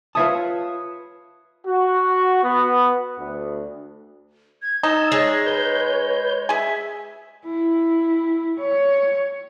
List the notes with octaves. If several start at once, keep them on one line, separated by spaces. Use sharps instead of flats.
F4 B4 C#5 E5 A5 D#6
F#4
B3
D2
G#6
D#4 A5 E6 G#6
G#3 C#5
B4 G6
G#4 E5 G#5
E4
C#5